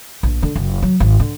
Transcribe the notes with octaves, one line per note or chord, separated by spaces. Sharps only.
A#1
D3
F#1
F#3
G#1
D3